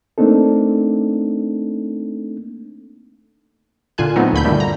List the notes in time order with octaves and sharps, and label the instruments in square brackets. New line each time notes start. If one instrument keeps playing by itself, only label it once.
[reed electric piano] A3 A#3 C4 D4 D#4 A4
[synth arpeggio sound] A#2 D3 F4 G#5 F#6
F#3 A3 B3 C4 D#4
D2 A#2 B5 G6
G2 A#2 D3 D#3 G3 A3
A#5